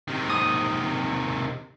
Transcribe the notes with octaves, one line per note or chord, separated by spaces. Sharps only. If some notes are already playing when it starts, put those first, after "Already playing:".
C3 D#3
D#6